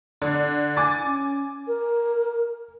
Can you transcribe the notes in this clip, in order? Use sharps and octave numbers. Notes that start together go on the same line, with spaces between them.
D3
G#5 D6 A6
C#4
A#4